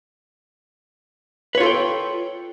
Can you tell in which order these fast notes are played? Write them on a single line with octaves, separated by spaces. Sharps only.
B4 C#5 F4 A4 G5